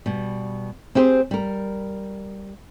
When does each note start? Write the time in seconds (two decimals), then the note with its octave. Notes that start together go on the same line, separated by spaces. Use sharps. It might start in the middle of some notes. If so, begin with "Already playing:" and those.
0.06 B2 G3
0.95 C4 E4 G4 G#4 C5
1.31 G3 A#4